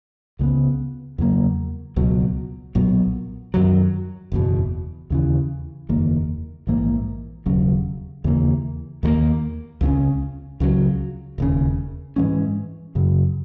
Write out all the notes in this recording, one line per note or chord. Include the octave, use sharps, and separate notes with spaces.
C#2 C#3 G#3 B3
E2 C#3 F#3 A#3
C#2 B2 F#3
B1 A#2 F#3 B3
F#2 D#3 F#3
F#1 E2 B2
D#2 C#3 E3
F#1 E2 D#3 A#3
A#1 G#2 E3 A#3
E1 D#2 C#3 F#3
D#2 C#3 E3 A#3
D#2 D#3 F#3 A#3
C#2 C#3 G#3 C#4
C#2 C#3 F#3
E1 D#2 C#3
G#2 E3 G#3 C#4
F#2 C#3 F#3